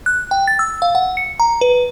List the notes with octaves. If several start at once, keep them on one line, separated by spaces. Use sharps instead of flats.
F#6
G5
A6
E6
F5
F#5
C#7
A#5
B4